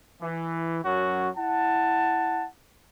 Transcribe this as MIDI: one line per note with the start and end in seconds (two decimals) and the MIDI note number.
0.22 0.81 52
0.85 1.29 42
0.85 1.29 54
0.85 1.29 61
0.85 1.29 66
1.36 2.46 64
1.36 2.46 78
1.36 2.46 81